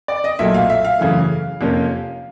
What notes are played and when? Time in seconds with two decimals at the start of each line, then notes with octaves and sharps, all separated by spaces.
0.08 D5
0.24 D#5
0.39 B1 A#2 F#3 A3 E5
0.54 F5
0.70 E5
0.85 F5
0.99 F#2 C#3 E3 A3
1.61 F2 C3 F3 A#3 C#4